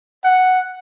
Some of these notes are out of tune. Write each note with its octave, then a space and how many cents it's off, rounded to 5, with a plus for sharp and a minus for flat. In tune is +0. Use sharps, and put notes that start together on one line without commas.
F#5 +0